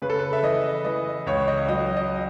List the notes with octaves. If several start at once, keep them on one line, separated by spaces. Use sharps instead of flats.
C#3 B4
A4
B4
E5
E3 D#5
E3 D#5
C#2 C#5
D#5
F#3 D#5
D#5